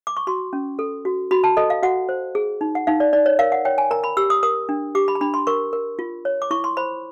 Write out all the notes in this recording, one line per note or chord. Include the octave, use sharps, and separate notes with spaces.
D6
C#6
F#4 C6
C#4
A4
F#4
F#4 B5
A5
A4 D#5
F5
F#4 F#5
C5
G#4
D#4
F#5
D#4 F5
D5
D#4 D5
C#5
A#4 F5
F#5
C#5 G5
G#5
A#4 A#5
B5
G4 E6
D#6
A#4 D#6
D4
G4 D6
B5
A#5
D4 B5
C6
A#4 C#6
A#4
F4
C#5
D6
E4 C#6
C6
C5 B5